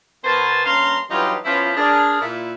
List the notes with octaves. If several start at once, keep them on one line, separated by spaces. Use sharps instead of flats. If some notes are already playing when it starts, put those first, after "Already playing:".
B2 B3 A#4 C5 G#5 A5
G2 A#3 C#4 F5 A#5 C6
G2 E3 F#3 D#4 F4 G4
F3 B3 C#4 E4 F4
D4 G#4 A#4
A#2 E4